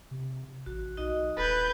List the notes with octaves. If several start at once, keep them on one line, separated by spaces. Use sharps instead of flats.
C3
A1 F#4
B1 D#4 F#4 D#5
D#1 A4 B4 G6